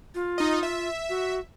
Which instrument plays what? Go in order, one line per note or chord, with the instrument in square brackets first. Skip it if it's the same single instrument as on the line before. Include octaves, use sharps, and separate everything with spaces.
[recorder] F4
[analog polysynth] D#4 D#5
E5
[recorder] F#4